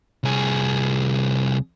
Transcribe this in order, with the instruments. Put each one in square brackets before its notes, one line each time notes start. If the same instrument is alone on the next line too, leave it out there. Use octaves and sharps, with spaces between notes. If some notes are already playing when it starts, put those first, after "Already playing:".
[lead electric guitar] C2 G#4